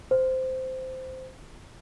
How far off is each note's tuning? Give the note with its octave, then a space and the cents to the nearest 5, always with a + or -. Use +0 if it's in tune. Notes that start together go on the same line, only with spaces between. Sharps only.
C5 -10